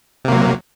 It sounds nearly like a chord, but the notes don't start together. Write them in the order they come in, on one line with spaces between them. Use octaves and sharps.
C3 A#3 F#3